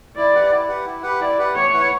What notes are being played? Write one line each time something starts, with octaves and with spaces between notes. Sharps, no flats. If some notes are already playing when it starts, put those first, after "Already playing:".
E4 D5
G4 B4 F#5
E4
G4 B4 F#5
E4
G4 B4 F#5
E4 D5
G4 B4 F#5
A3 C#5
E4 B4 F#5